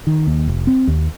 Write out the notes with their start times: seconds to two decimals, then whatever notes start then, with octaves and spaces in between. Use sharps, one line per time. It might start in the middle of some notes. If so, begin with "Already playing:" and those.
0.07 D#3
0.27 D#2
0.48 F1
0.67 C4
0.87 D#2